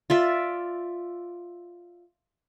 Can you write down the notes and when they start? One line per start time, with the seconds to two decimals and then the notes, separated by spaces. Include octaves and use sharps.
0.10 F4 D5 E5